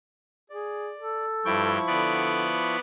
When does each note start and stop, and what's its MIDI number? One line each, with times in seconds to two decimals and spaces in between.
0.50 0.91 68
0.50 1.26 74
0.99 1.77 69
1.45 1.78 43
1.45 2.77 53
1.45 2.77 64
1.45 1.78 79
1.45 2.77 85
1.87 2.57 50
1.87 2.79 59
1.87 2.79 74
1.87 2.79 83